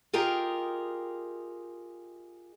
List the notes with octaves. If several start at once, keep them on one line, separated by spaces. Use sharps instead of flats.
F4 G4 G#4 A#4 D#5 G5